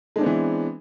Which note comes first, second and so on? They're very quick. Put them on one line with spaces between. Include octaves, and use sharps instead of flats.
G#3 D4 C4 B3 E3